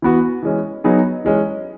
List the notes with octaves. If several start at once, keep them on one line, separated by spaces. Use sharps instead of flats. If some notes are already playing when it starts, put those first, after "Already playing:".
E3 B3 F#4
E3 G#3 C#4
F#3 B3 D#4 G#4
E3 G#3 C#4